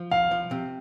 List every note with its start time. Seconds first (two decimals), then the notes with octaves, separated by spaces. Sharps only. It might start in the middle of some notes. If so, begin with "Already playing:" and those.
Already playing: F3
0.11 C2 F5
0.31 F3
0.51 C3